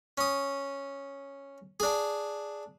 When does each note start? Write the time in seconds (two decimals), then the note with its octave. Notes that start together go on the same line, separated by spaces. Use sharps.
0.18 C#4 D#6
1.80 D4 G#4